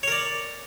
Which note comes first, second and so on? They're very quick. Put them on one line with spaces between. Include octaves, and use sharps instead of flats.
C#5 A#4 D5